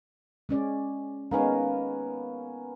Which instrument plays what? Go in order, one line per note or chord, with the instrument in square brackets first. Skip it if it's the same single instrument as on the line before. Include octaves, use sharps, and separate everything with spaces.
[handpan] G#3 C#4 D5
[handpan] G#3 D#4 F5 [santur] A#3 B3 C#4